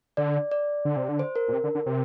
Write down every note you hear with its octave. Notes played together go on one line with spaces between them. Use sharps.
D3 D5
D5
D3
C3
D3
C5
A#4
A#2
C3
D3
D3
C3